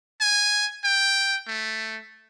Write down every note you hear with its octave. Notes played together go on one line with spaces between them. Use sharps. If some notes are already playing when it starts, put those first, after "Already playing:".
G#5
G5
A3